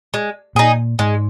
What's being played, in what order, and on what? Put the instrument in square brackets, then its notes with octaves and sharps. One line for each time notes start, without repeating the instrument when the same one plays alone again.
[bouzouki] G#3
[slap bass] A#2 [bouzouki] D#4 G#4
[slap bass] G#2 [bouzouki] G#3